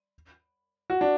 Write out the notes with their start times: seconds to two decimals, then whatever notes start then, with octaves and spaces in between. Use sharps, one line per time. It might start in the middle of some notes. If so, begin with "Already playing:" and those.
0.90 F#4
1.01 D4